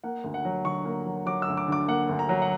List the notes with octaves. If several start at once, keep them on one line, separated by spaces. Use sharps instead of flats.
A#3 F#5
D2
F#5
F#3
D3 C#6
A#3
F#3
F#3 D6
E6
D2
D6
D3 D6
A#3 F#5
D2
A#5
F#3
F#5